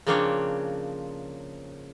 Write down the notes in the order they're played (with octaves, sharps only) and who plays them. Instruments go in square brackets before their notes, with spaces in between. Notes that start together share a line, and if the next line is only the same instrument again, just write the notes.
[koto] C#3 F3 A#3 C4 D4 C#5